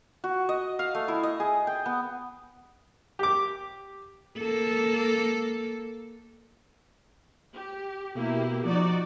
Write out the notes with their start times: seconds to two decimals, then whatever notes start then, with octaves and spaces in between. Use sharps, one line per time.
0.24 F#4
0.49 D#5
0.79 F5
0.95 A3
1.08 E4
1.23 D#5
1.40 G#4
1.67 G5
1.86 B3
3.19 G4 D6
4.39 A#3 A4
7.55 G4
8.15 B2 A#3 E4 G4
8.65 F3 D#4 F#4 D5